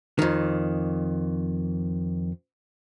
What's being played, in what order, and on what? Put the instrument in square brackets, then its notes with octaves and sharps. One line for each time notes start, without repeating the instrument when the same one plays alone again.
[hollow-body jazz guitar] F2 D#3